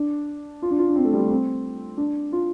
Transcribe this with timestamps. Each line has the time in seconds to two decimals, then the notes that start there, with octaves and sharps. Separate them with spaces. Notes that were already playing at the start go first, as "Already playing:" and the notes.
Already playing: D4
0.62 F4
0.71 D4
0.79 F4
0.87 D4
0.96 C4
1.04 A3
1.14 G3
1.21 A3
1.30 C4
1.97 D4
2.32 F4